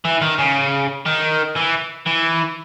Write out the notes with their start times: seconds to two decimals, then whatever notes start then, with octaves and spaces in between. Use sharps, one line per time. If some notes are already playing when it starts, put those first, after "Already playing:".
0.05 E3
0.22 D#3
0.39 C#3
1.06 D#3
1.56 E3
2.07 E3